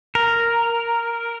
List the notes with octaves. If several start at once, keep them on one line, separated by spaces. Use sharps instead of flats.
A#4